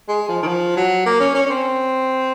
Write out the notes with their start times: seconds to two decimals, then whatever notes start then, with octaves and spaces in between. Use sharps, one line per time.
0.08 G#3
0.28 F3
0.42 D#3
0.47 F3
0.76 F#3
1.06 A#3
1.20 C#4
1.35 C#4
1.46 C#4
1.50 C4